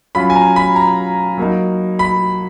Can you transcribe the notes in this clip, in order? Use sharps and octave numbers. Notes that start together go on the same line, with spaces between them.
F#3 C#4 F4 B5
G#5
A#5
B5
A#5
F#3 A#3 D#4
B5